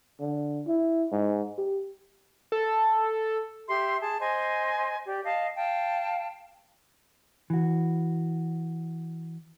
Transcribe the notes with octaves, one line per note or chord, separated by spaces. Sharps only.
D3
E4
G#2
G4
A4
G4 E5 C6
G#4 A5
C5 D#5 G#5
G4 D5
D#5 F5 A5
F5 G5 A5
E3 F#4